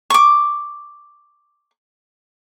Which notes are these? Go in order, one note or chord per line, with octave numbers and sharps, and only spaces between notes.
C#6 D6